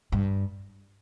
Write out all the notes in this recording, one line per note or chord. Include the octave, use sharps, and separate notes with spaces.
G2